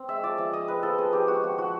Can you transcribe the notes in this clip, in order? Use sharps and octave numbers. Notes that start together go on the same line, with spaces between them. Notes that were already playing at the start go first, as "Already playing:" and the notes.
Already playing: C4
G#3 E5
F3 D5
F3 E5
C4 D#5
G#3 B4
F3 A4
F3 G#4
C4 G4
G#3 F#4
F3 F#4
F3 F#4